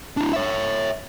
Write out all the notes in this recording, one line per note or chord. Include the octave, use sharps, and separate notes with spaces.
D4 E4
C#5 E5